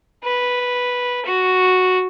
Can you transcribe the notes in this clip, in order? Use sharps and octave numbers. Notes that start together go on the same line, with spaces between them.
B4
F#4